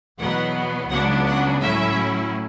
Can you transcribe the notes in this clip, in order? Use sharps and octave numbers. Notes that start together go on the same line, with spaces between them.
E2 B2 F#3 B3 F#5
C#2 C#3 F#3 B3 D4 F#5
F#5
A2 F#3 C#4 E4 E5